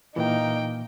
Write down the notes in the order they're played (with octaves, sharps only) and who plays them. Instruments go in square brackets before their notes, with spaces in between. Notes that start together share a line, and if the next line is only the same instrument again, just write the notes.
[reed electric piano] A#2 E3 [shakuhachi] A#3 [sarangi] D#4 [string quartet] G5